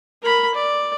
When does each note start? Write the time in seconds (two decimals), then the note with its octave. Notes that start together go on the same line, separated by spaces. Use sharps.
0.23 A#4 B5
0.55 D5